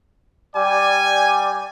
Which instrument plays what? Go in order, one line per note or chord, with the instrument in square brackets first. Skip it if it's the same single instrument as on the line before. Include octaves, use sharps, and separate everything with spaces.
[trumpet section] G3 D5 [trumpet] G#5